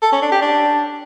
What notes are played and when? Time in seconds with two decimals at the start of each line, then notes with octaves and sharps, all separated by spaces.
0.03 A4
0.12 C#4
0.22 D4
0.32 G4
0.42 D4